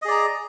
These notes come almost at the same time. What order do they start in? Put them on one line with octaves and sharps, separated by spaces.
D#5 G#4 D5 A#5